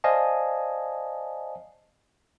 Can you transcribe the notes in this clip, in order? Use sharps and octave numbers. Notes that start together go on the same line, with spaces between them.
C5 D5 D#5 F5 G#5 A5